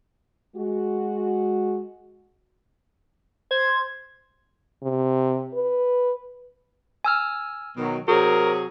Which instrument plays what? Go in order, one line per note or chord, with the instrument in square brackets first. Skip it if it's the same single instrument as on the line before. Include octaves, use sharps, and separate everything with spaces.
[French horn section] G#3 F#4
[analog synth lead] C5 [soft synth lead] G#6
[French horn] C3
B4
[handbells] G#5 E6 F6
[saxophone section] B2 D#3 F#3
[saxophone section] C3 F#3 G#4 [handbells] F#4 [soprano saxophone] A#4